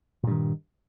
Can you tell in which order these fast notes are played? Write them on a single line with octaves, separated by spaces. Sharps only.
A#2 G2 D#3